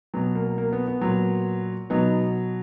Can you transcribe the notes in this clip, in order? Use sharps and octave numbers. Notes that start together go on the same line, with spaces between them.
B2 F#3 B3
A#3
A#3
B3
B3
A#2 F#3
B2 F#3 B3 D#4